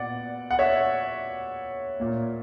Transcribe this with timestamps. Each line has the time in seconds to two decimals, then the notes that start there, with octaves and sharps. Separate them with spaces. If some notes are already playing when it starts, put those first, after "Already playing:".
Already playing: A#2 B3 D5 F#5
0.51 F#5
0.59 C#5 E5
2.00 A#2 A#3